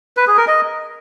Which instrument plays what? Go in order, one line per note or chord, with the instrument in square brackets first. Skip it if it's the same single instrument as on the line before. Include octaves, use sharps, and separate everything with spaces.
[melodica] B4
G#4
A#4
D#5